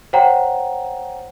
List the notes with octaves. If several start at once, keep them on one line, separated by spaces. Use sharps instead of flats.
C5 C#5 F#5 G5 A#5